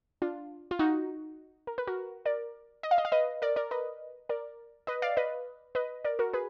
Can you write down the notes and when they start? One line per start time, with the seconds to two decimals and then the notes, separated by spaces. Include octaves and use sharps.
0.22 D4 F4
0.71 F4
0.79 D#4 F#4
1.67 A#4
1.78 B4
1.87 F#4 A#4
2.25 A#4 D5
2.83 D#5
2.91 F5
2.98 D#5
3.05 F5
3.12 B4 D#5
3.42 A#4 D5
3.56 A#4 D5
3.71 B4 D#5
4.29 A#4 D5
4.87 B4 D#5
5.02 D5 F5
5.17 B4 D#5
5.75 B4 D#5
6.05 A#4 D5
6.19 F#4 A#4
6.33 G#4 B4